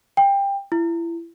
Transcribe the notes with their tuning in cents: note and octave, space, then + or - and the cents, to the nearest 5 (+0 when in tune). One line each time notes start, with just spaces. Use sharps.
G5 +20
E4 +30